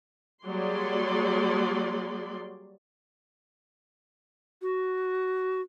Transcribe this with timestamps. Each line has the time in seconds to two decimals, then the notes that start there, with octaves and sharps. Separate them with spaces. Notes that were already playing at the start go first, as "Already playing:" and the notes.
0.46 F#3 G3 A#3 G#4 D5 C6
4.62 F#4